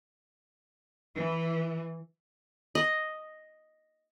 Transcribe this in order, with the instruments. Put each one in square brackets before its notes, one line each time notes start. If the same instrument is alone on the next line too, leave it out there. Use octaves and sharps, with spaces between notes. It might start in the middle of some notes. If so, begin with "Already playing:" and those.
[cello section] E3
[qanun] D#5